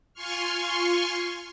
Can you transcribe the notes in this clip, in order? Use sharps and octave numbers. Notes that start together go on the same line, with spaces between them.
F4 G#5 C6 C#6 F6